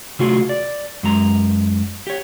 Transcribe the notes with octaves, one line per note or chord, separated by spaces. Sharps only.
C3 F#3 A3 F4 F#4 G#4
D5
F#2 G#3 A#5
G4 C#5